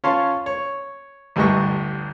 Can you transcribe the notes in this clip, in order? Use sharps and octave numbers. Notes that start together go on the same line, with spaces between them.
C#4 F4 C#5 F5 A5 C6
C#5
A1 D2 G2 G3 D#5 C#6